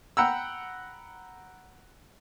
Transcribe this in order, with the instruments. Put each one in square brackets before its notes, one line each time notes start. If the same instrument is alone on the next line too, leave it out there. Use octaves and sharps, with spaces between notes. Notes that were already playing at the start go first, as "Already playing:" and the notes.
[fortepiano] F#5 G5 A#5 B5 E6